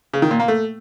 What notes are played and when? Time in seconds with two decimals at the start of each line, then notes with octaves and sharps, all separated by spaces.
0.14 C#3
0.22 D#3
0.31 A#2
0.40 A#3
0.48 A3